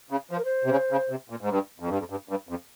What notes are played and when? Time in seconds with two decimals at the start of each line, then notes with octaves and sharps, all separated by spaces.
0.10 C#3
0.31 F3 C5
0.38 A#4
0.45 C5
0.64 C3
0.71 C#3
0.91 C#3
1.10 C3
1.30 A#2
1.41 G#2
1.50 G2
1.80 F2
1.89 G2
1.99 F2
2.10 G2
2.29 G2
2.49 F2